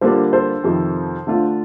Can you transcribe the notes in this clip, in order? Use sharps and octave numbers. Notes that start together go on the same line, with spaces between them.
D3 G3 A#3 D4 F4 A4 C5
A4 C5
F2 C3 D#3
D3 A3 D4 F4